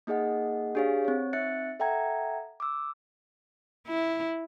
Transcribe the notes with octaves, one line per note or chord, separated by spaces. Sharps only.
A#3 D#4 G#4 D#5 F#5
D4 G4 G#4 C#5 F5
C4 C#5
C4 D#4 E5 F#6 A6 C#7
A4 E5 F#5 G5 A#5 G#6
D6 E6
E4